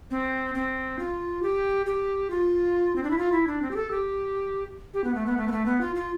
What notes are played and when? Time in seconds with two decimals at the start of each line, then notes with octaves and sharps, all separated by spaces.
0.11 C4
0.55 C4
0.99 F4
1.43 G4
1.86 G4
2.30 F4
2.96 C4
3.04 D4
3.11 E4
3.18 F4
3.32 E4
3.47 D4
3.62 C4
3.71 G4
3.76 A4
3.91 G4
4.94 G4
5.04 B3
5.15 A3
5.26 B3
5.37 A3
5.48 B3
5.52 A3
5.66 B3
5.81 F4
5.95 F4